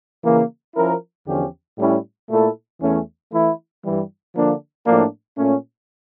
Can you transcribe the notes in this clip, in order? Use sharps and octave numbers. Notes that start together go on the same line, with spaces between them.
C#3 E3 A#3
F3 C#4 E4 A#4
E2 D3 F3 C#4 G4
A2 G3 C#4 E4
A#2 A3 E4 A4
E2 E3 A3 C#4
E3 A3 E4
G2 E3 G3
D3 F3 A#3 D4
A2 F3 A#3 D4
A#2 A3 C#4